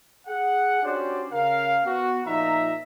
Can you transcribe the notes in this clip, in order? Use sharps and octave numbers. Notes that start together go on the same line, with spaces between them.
G#4 F#5
C#4 D4 F#4 G4 C5 D5
C#3 A#4 F5
B3 F#4
A#2 F3 D#4 E5 A#5